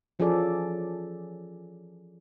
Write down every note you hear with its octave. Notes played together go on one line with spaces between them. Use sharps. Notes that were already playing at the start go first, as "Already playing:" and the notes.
E3 F3 C#4 G#4 A4 D5